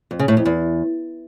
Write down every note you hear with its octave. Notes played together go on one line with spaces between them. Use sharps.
F2
C#3
A2
F2
E2